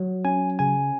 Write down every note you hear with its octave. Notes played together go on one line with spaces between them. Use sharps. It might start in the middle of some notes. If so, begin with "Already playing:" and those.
Already playing: F#3
C#4 G#5
C#3 G#5